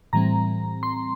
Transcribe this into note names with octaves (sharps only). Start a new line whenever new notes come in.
A2 E3 G3 C4 A#5
C6